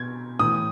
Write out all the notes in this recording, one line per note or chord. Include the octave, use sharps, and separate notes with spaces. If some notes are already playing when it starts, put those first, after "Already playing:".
Already playing: B2 G#6
A2 E3 D#6